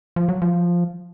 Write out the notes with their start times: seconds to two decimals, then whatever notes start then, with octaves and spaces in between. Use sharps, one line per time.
0.16 F3
0.29 F#3
0.42 F3